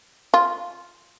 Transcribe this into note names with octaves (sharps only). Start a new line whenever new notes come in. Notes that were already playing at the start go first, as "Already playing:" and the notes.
F4